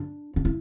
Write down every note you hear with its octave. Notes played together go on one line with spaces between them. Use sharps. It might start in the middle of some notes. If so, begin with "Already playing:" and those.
Already playing: D4
D4
E4